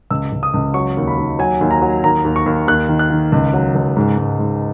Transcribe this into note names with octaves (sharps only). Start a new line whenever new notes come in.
C#2 E6
C#2
D#6
C#2
F#3 C#6
D#2
B5
D#2
F#3 G#5
D#2
A#5
F#3
D#2 A#5
D#2
C#6
D#2
D#2 F#6
D#3
F#6
D#3
C#2
F#3
C#2
G#2
G#2
G#2